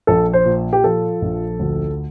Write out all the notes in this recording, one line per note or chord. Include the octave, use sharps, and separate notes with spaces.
A#1 A4
C5
A#2
G4
F3 A4
A#1
D2